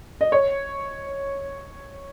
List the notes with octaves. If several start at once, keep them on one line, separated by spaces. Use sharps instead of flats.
D#5
C#5